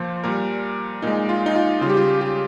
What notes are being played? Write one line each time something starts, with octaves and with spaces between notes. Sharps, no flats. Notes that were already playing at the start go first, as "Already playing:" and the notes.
Already playing: A#2 F3 C5
A#2 G3 A#4
A#2 G#3 D#4
F4
D#4
F4
C#3 F4
G3 G4
F4
G4